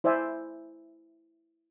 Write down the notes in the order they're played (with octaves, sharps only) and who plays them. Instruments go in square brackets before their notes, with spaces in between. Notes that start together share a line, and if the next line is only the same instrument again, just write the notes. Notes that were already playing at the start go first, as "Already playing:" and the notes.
[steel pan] E4 C5 D5 E5 G#5